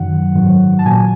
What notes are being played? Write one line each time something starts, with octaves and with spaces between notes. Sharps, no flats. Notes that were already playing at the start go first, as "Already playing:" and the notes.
Already playing: F#2 D#3 F#3 F#5
G#2 D#3 F#3
A5
A#2 F#3 G#5